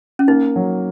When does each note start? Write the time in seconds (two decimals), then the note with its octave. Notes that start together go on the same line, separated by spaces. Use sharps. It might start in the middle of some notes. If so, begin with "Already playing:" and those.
0.19 C#4
0.28 A#3 D#4
0.56 F#3